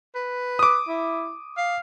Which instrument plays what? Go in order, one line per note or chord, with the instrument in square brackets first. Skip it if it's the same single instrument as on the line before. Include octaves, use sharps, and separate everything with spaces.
[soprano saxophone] B4
[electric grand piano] D6 D#6
[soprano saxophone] E4
F5